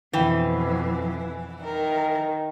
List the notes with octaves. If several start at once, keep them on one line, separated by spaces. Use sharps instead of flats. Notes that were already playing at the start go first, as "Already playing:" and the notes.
F2 B2 E3 G5
D#3 A#4